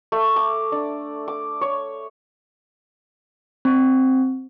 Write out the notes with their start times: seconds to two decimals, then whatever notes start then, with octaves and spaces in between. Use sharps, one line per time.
0.12 A3
0.36 D6
0.72 D4
1.28 D6
1.61 C#5
3.65 C4